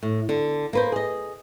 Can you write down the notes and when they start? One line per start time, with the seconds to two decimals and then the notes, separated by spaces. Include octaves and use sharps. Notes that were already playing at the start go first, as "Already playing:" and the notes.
0.03 A2
0.29 D3
0.73 A#3 B4 C5
0.92 G#4 D#5